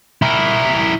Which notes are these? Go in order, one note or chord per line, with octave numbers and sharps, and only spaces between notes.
E4 A#4